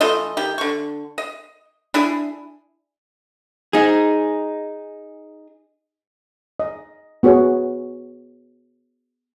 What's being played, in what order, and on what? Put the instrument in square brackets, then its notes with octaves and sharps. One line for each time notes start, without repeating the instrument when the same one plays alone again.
[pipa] E3 A3 F4 D#5
D#3 G4
D3 C#6
D#5
D4 E4 G#4
[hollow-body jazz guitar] D#4 G#4
[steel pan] D#5
B3 F#4 G#4 C#5